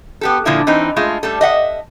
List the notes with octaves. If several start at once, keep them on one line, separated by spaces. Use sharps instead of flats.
B3 G4 A4
A#2 D3 F3 A#3 E4 A4
E3 C4 D#4
G#3 A3 F4
G3 A3 A4
D#5 E5 F#5